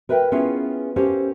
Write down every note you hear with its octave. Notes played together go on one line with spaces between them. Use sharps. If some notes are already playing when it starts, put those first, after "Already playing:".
A#4 B4 E5 F5 G5
B3 C#4 E4 F4 G#4
C#4 G4 A4 A#4 C5 F5